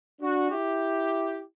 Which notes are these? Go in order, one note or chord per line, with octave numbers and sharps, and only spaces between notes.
D4 F#4
E4 G4